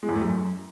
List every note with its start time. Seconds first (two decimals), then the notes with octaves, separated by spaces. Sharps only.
0.03 G#3
0.09 E2
0.15 A3
0.21 F#2